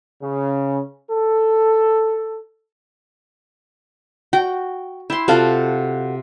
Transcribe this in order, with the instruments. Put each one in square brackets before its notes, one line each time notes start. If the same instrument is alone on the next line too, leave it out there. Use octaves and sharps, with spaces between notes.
[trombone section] C#3
A4
[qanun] F#4 [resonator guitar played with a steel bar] G5
[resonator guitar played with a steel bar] E4 [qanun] G5 C6
[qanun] C3 F4 [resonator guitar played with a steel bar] F#4 A4 F5